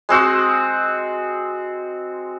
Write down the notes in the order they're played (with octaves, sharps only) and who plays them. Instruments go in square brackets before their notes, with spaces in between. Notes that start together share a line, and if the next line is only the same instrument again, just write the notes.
[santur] G#3 C4 F#4